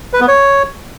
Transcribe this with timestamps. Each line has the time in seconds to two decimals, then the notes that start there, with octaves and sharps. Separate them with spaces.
0.13 B4
0.21 B3
0.28 C#5